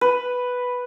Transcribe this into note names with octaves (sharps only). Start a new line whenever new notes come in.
B4